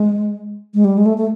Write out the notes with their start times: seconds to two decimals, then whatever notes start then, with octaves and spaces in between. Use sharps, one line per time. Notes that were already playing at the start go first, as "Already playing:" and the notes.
Already playing: G#3
0.74 G#3
0.85 G3
0.98 G#3
1.06 A3
1.18 A3